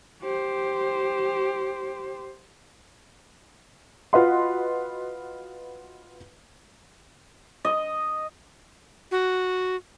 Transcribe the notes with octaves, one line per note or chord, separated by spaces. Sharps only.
G4 C5
F4 F#4 B4 D#5 F#5 C6
D#5
F#4